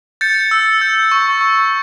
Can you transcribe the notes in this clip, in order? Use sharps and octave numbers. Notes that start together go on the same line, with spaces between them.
G6 A6 C#7
E6
G6
C#6
C#6